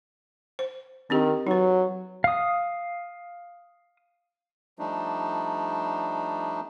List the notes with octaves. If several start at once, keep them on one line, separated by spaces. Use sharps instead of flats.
C5
D#3 C4 D4 G4
F#3 D#4 B4
F5 D#6
F3 G3 A3 D4 D#4